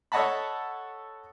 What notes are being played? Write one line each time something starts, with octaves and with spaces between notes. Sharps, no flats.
A4 C#5 D#5 F#5 A5 B5